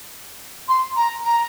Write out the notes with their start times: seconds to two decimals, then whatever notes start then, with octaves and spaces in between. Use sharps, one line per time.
0.68 C6
0.96 A#5
1.25 A#5